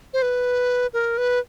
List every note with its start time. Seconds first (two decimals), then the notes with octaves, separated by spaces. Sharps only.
0.13 C5
0.22 B4
0.93 A#4
1.18 B4